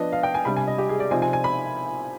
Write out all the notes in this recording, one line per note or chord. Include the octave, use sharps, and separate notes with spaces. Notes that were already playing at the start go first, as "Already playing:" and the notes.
Already playing: F3 B3 D4 D#5
F5
G5
G#5
C3 G3 D4 B5
G#5
D#5
G4
G#4
D5
C3 F3 C4 D#4 G#5
G#5
G#5
B5